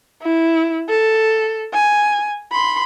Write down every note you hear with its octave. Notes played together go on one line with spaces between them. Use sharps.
E4
A4
G#5
B5 C6